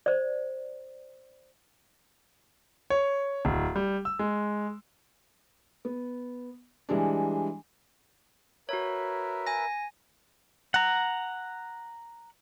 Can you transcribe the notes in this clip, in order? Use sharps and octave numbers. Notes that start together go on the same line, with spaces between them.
C5 D5
C#5
D1
G3
E6
G#3
B3
E3 G3 G#3 D4
F#4 A#4 B4 C#5 E5
G#5 A#6
F#5 A#5